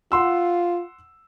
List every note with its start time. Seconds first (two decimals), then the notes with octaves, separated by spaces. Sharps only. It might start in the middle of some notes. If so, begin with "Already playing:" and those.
0.12 F4 F#5 C6 E6